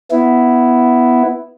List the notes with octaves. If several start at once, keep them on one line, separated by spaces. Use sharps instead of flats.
B3 E4